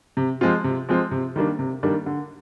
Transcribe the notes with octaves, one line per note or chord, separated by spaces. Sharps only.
C3
F3 G#3 C4 F4
C3
F3 G#3 C4 F4
C3
D#3 G3 A#3 D4
C3
D#3 G3 A#3 D4
D3